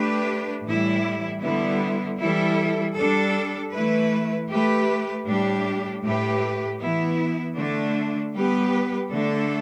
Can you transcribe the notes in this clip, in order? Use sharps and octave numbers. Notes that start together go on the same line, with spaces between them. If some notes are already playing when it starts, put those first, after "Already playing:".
Already playing: A3 D4 G4 B4
A2 E3 G3 E4
D3 G3 B3 E4
E3 G3 E4 A4
G3 D4 A4
E3 A3 E4 B4
A3 G4 B4
A2 G3 D4 G4
A2 A3 G4 B4
E3 B3 E4
D3 A3 D4
G3 B3 G4 B4
D3 A3 D4 A4